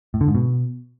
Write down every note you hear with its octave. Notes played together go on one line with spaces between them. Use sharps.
A2
D3
G#2
B2